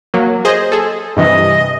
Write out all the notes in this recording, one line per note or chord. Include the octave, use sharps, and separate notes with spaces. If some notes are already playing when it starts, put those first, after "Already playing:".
F#3 A#3
G#4 C5 D#5
G#4 A4
G2 C3 E3 D#5